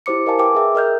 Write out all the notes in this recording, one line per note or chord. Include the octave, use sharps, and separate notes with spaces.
E4 G4 C5 D6 C#7
A#4 D#5 F5 G#5 A5
B4 G5 D6
G#4 E5 G5
A#4 D#5 F6 G6